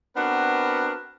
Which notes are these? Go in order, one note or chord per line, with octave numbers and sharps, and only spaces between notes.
B3 C4 D4 F#4 A#4 B4